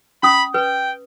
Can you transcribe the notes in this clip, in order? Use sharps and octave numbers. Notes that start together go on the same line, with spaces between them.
C#4 B5 D#6
B4 G5